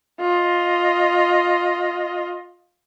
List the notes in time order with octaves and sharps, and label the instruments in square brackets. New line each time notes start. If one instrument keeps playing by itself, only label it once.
[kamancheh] F4 D#5